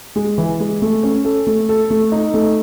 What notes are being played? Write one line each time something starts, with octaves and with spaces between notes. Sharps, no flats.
G#3
E3
G#3
A3
C#4
A4
A3
A4
A3
D#4
A3